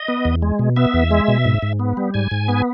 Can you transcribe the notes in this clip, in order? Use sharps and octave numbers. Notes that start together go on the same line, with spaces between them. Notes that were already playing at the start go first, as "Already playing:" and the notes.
Already playing: D#5
B3
E2
G#3
B2
B3 E5
E2
G#3
B2
G#2
G#2
B3
G3
G#2 G#5
G#2
B3